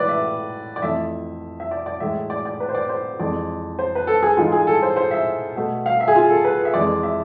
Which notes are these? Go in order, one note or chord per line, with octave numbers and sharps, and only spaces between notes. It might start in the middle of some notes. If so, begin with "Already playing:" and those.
Already playing: A2 E3 G#3 B4 D5
E5
D5
F2 E3 A3 E5
E5
D5
D5
A2 E3 G#3 E5
D5
D5
B4
C5
D5
C5
F2 E3 G#3 D5
C5
B4
A4
G#4
G#2 E3 G#3 F4
G#4
A4
C5
C5
E5
B2 A3
F5
E5
G#4
F4
A4
B4
E5
F2 E3 G#3 D5
E5